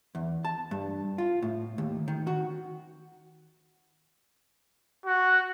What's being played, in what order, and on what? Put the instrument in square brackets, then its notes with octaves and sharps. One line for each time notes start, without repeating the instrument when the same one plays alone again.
[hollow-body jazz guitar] E2
A5
G2
F4
A2
D#2
D#3
F#4
[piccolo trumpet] F#4